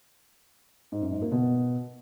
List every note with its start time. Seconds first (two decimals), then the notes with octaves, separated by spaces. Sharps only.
0.92 G#2
1.02 F#2
1.12 G#2
1.22 A#3
1.32 B2